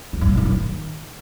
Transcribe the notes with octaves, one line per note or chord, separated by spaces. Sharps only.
D3
G2
A#2
F#2
D#3